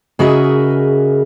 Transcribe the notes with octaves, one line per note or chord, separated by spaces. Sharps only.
C#3 F#4 G#4 A#4 D#5 E5